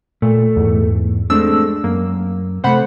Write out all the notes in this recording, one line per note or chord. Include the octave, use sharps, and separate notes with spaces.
A#2 A3
E2 G#2
G#3 A3 C4 D4 E6
F#2 A#3
C3 A3 C5 F#5 B5